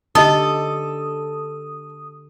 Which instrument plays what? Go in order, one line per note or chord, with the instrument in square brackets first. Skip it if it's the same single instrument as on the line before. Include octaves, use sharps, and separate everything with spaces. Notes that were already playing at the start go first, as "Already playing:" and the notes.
[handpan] D3 G4 [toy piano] D#4 D#5 A5 [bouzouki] A4 [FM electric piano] D#6